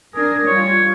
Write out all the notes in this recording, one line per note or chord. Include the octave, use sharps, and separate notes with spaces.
D4 G#4 A#4
G3 F4 C#5